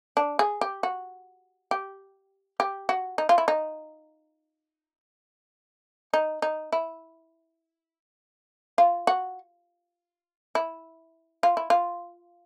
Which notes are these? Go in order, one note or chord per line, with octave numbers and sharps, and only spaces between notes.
D4
G#4
G4
F#4
G4
G4
F#4
D#4
F4
E4
D#4
D#4
D#4
E4
F4
F#4
E4
F4
E4
F4